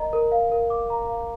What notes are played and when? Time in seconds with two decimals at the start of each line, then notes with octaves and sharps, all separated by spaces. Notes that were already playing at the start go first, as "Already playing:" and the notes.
Already playing: A#4 D#5 A#5
0.13 A#4
0.32 F5
0.52 A#4
0.70 D6
0.90 A#5
1.09 F5